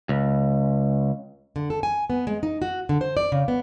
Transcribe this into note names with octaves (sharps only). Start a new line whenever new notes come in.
C#2
D3
A4
G#5
B3
G#3
D#4
F#4
D3
C5
D5
C#3
B3